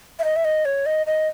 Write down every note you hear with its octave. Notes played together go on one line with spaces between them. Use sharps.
E5
D#5
E5
D#5
C#5
D#5
D#5